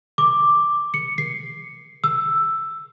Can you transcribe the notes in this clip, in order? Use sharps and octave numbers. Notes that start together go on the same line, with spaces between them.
D6
C#7
C7
E6